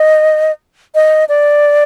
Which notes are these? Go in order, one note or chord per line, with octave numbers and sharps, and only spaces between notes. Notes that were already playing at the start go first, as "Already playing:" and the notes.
Already playing: D#5
D#5
D5